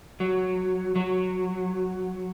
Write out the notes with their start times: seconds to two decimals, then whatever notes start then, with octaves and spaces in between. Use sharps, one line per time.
0.20 F#3
0.96 F#3